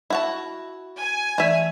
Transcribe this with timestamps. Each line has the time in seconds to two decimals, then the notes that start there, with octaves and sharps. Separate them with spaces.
0.10 E4 F#4 A5
1.00 G#5
1.38 E3 A3 D5 E5